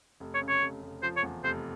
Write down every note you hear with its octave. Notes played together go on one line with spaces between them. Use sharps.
F1
C#5
C#3
C#5
F1
F1
F3 C5
C#5
E2
F1 C5